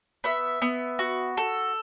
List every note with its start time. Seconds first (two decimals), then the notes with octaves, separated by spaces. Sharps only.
0.24 B3 E5
0.62 B3
0.99 F#4
1.37 A4